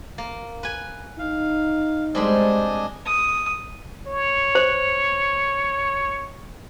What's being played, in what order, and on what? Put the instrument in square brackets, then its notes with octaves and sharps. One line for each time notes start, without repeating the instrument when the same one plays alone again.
[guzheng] A#3
B4 G#5
[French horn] D#4 [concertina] F5
[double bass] G3 G#3 [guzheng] C4 B5 C6 [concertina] D4 D#5 G#5
[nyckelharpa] D#6
[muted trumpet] C#5
[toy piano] C5